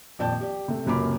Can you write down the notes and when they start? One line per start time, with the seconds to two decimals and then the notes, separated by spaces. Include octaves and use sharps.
0.19 D#1 F2 D5 G5 A5 G6
0.41 G4 D5
0.68 C3 A3
0.86 C#2 F#2 C3 A#3 B5 D6